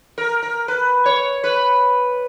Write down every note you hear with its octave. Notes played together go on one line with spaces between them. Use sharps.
A#4
A#4
B4
C#5
B4